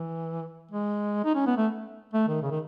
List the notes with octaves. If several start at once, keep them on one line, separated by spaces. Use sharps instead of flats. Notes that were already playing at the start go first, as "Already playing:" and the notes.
Already playing: E3
G#3
D#4
C#4
B3
A3
A3
D#3
C#3
D#3